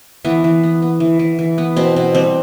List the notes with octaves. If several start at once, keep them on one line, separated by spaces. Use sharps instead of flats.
E3 B3
E3
B3
B3
E3
E3
E3
B3
B2 C4
B2
G3 C4